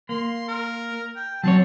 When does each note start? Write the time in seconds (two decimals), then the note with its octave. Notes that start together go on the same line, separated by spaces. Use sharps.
0.09 A#3 C6
0.48 A#4
1.16 G5
1.44 F#3 C4 C#5 A5